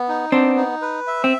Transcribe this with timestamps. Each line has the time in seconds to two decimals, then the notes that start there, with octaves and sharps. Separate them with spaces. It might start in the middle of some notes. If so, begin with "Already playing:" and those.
Already playing: B3
0.08 D#4
0.32 B3 C4 D4
0.57 D#4
0.82 B4
1.07 E5
1.24 C4